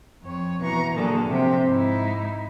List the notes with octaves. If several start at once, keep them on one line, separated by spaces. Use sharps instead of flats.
F2 C#5
B2 E3 A#5 C#6
A#2 D3 F#3 A#3 G#4 A4
C3 F3 C4 G4
G#2 D#4 E4